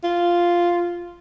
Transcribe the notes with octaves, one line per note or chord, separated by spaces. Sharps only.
F4